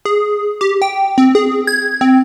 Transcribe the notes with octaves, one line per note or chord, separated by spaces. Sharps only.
G#4
G4
G5
C4
G#4
G#6
C4